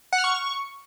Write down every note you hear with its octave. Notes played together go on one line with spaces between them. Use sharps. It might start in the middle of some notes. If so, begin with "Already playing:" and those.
F#5
F6
C#6